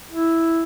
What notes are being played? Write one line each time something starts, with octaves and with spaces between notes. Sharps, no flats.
E4